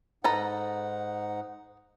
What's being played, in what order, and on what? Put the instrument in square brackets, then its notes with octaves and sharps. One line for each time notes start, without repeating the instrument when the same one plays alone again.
[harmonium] G#2 D#4 F#5 [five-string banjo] A4 B4 A#5